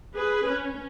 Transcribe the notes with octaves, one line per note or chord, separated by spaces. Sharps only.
G#4 B4
C#4